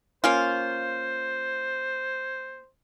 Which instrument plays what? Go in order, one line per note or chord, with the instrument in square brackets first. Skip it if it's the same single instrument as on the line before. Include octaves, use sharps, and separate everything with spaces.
[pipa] A#3 C#4 F4 [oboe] C5